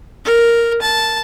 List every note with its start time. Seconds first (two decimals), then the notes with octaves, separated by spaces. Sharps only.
0.25 A#4
0.82 A5